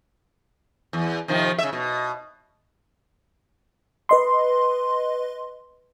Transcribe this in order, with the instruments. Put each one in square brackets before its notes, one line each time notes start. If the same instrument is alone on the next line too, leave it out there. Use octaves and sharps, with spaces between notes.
[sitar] E2
C3 D#3 F3
C#3 E5
B2
[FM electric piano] B4 D#5 C6